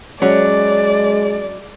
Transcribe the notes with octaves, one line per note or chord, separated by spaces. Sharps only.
F#3 G#3 C#4 D5